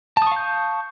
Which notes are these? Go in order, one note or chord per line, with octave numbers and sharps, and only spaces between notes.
F5 A5 C#6 D#6 G6